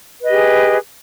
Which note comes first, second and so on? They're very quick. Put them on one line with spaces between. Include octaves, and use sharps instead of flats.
B4 D#5 G4 G#4